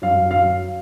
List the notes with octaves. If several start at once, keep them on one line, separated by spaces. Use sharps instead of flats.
F#2 F5
F#3 F5